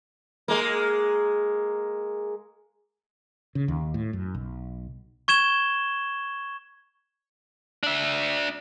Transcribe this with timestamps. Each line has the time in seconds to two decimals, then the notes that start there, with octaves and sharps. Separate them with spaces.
0.48 G#3 A#3
3.55 C#3
3.68 D#2
3.94 A2
4.13 F#2
4.35 B1
5.28 C#6 G#6 E7 G7
7.83 D4 E5